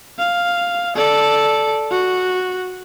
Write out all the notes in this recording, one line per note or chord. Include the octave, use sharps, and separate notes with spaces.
F5
A4 D5
F#4